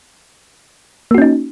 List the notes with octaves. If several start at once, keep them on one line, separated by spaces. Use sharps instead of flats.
A#3 C#4 D#4 F#4